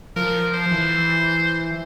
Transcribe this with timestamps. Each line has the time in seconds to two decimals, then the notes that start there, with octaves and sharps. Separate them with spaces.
0.16 F3 A#4
0.54 C5
0.72 E3